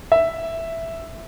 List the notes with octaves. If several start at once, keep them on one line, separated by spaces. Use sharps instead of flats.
E5